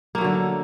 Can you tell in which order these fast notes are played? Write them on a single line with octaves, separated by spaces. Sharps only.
A#3 A3 F#3 D3